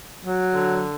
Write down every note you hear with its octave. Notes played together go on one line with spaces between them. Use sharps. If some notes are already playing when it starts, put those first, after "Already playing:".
F#3
D3